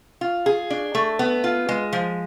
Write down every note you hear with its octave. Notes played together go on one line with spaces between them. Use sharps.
F4
G#4
D4
A3
B3
F4
G#3
F3